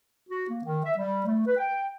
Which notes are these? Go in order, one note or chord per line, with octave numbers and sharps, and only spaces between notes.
F#4
A#3
D#3
E5
G3
A3
B4
G5